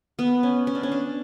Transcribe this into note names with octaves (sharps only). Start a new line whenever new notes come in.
B3
C#4
C#4
D4
C#4
D4